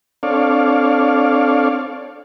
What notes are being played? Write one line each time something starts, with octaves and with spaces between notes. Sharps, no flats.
C4 D4 A4 C#5 D5 F5